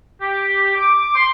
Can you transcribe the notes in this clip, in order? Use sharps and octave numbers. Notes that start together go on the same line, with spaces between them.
G4
D6
C6